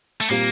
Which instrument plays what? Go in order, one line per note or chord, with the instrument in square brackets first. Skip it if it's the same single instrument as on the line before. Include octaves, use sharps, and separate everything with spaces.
[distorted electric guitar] A3
[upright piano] A#2 G3 C4 F4 [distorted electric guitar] A#3